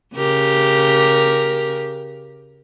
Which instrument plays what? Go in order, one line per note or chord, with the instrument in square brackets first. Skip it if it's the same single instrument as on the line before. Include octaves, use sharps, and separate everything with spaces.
[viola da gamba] C#3 G4 A#4